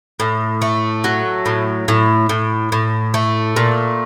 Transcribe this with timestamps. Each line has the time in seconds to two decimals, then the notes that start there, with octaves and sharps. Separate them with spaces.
0.20 A2
0.62 A3
1.04 F#3
1.46 A2
1.88 A2
2.29 A2
2.72 A2
3.14 A3
3.56 A#2